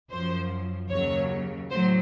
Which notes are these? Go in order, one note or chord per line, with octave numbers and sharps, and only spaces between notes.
F#2 F3 C5
D#2 C#3 F#3 C#5
A2 F#3 C5